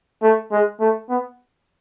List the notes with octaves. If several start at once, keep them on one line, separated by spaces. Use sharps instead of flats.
A3
G#3
A3
B3